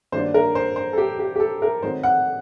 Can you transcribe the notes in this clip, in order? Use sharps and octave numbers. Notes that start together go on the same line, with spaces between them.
G2 D#3 F#3 A#3 D4 C5
A#4
C5
C5
A4
G4
G4
G4
A4
A#4
D#3 F#3 A3 C4 D#4 C5
F#5